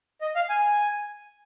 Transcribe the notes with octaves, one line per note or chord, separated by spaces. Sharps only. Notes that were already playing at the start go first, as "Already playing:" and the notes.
D#5
F5
G#5